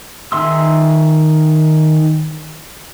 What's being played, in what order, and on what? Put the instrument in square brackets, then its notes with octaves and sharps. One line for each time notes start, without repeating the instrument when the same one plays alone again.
[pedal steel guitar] D#3 G#4 E5 C6 E6